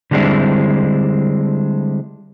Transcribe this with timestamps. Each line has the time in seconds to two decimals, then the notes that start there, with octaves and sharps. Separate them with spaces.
0.11 D3 G3 G#3 C4 D4 E4